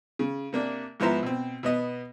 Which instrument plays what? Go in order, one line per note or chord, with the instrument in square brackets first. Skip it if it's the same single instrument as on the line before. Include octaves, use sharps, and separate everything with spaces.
[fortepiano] C#3
C3 A#3 D4
G#2 F3 B3 E4 C5 A#5
B2 C4
B2 B3 D#5